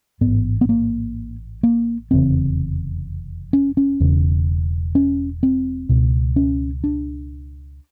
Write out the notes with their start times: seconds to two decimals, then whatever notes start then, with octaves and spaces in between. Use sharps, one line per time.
0.21 A1 G#2 B3
0.61 B3
0.69 A#3
1.63 A#3
2.11 F1 E2 C#3 C4
3.53 C#4
3.77 C#4
4.00 E1 E2 C#3
4.95 C#4
5.43 C4
5.89 C#2 B2
6.36 C#4
6.84 D4